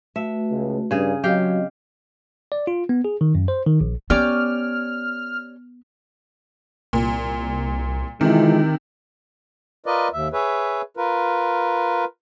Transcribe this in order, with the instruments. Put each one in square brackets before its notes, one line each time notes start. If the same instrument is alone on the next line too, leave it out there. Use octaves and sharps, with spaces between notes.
[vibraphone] A3 F#4 B4 [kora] E5
[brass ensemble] C#2
[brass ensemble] G2 [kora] C#3 G#4
[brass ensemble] F#3 [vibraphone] C4 D#5 [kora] G4 F5 G5
[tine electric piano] D5
F4
B3
G#4
D#3
F#2
C5
D#3
A#1
[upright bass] B3 [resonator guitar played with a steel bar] C#4 G4 D5 [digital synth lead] F6
[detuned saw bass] C2 [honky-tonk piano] A#2
[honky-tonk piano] C3 [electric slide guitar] D#3 [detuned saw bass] E3 [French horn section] G#3 E4 F4
[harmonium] F4 A#4 B4 D5 D#5
D#2 E5
G#4 B4 C#5 E5
F4 A#4 B4